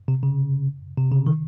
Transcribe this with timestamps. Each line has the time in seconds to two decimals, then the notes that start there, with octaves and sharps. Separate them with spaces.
0.08 C3
0.23 C#3
0.98 C3
1.12 C#3
1.27 D#3